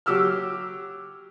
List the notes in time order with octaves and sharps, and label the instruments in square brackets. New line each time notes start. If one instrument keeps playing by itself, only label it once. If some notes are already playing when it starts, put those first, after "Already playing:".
[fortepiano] F#3 G4 E6 F6